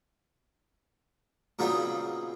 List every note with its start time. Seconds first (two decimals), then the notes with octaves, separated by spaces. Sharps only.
1.59 A#2 C#3 F#3 B3 C4 D#4